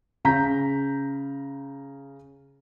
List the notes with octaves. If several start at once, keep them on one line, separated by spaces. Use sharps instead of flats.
C#3 A#5 G6 B6